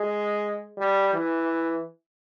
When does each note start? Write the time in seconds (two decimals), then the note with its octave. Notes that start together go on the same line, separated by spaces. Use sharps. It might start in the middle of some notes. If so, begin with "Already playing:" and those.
Already playing: G#3
0.78 G3
1.14 E3